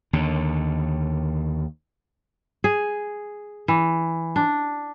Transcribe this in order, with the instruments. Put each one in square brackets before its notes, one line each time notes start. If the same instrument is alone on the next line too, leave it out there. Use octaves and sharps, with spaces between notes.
[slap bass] D#2 D3
[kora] G#4
E3
D4